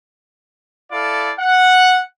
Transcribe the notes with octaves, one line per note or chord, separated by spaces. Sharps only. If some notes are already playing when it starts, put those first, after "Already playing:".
E4 A4 D5 F5
F#5